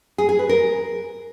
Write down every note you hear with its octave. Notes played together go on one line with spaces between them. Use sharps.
G#4
G#4
B4
A#4